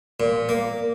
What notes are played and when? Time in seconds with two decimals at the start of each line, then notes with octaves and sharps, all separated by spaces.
0.20 A#2
0.49 A#3